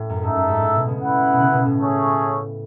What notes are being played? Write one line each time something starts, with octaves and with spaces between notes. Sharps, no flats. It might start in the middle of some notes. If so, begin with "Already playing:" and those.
Already playing: A2
F#2
G#2 D#4 A4 E5
F#2
G#2
A2
B2
C#3
E4 B4 F#5
B2
C#3
B2
A2
A3 C#4 G#4 C#5